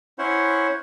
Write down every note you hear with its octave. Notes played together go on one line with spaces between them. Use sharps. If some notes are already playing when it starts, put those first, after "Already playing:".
C#4 E4 C5 C#5 F#5